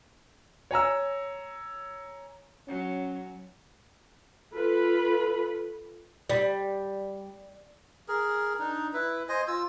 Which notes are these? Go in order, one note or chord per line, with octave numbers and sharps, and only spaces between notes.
C#5 G#5 A#5 E6
F#3 C#4
F4 A4 B4 B5
G3
G#4 A#4
D4 D#4
E4 B4
C5 D#5 G#5
F4 E6